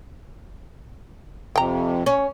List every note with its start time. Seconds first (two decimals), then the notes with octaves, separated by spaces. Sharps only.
1.56 F2 C3 G5 A#5
2.06 C#4